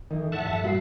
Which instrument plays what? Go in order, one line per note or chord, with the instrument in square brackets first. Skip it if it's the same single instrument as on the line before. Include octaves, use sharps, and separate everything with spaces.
[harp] F2 E3 A#3 [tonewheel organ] D#3
[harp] E2 A2 [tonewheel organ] E5 F#5 A5
[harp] G2 F3
[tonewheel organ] A#2 B5 [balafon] G3 [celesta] F#4 C7